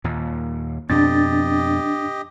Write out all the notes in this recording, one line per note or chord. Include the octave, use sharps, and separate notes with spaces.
D#2 A#2
F2 B2 C4 D4 G4 D#5 A6